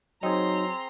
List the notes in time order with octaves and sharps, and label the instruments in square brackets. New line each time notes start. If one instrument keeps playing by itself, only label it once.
[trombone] F#3 [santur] C4 G#4 [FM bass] D#4 [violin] A#5 C6